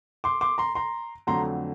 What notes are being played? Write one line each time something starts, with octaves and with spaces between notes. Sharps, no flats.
C6 D6
C6 D6
A#5 C6
A#5 C6
F2 D3 F#3 A3 A#5 C6